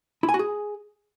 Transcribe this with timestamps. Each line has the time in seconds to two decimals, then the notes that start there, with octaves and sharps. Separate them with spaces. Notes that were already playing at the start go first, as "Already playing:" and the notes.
0.23 E4
0.29 G#5
0.34 F#4
0.39 G#4